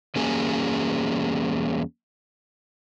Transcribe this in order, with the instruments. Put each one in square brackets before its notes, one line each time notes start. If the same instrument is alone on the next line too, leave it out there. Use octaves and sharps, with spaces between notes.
[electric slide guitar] E2 G3 A#3 C#4 G#4 G#5